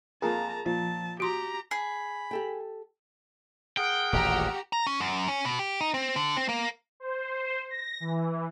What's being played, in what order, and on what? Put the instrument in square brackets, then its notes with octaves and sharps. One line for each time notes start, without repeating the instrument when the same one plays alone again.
[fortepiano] F2 F3 A#3 [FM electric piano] G#4 A#4 [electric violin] A5 A#5
[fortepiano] A#2 [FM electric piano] F3 [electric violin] A5
[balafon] F#4 C6 [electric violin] G4 A#5
[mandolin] G#4 [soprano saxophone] B5
[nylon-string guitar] G4 A4 G5
[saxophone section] G#4 A#4 F#5 [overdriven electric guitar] G5
[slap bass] D#1 A1 A#2 [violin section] F#4 G4 A#5
[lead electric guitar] A#5
C#4
F#2
C#4
B2
G4
D#4
C4
D3
C4
A#3
[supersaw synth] C5
A#6
E3